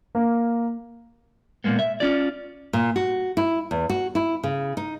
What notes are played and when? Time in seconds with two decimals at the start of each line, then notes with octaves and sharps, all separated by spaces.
0.15 A#3
1.64 A#2 F3 G#3 A#3 B3
1.79 E5
2.00 C#4 F4 D5
2.73 A#2
2.96 F#4
3.37 E4
3.71 E2
3.90 F#4
4.15 E4
4.43 C#3
4.77 D#4